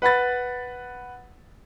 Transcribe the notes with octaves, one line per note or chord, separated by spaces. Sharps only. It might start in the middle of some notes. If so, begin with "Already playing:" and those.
B4 F#5 B5 A6